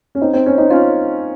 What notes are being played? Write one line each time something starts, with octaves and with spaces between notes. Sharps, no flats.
C#4
C4 D#4
C4
C#4
C4 D#4
C#4 F4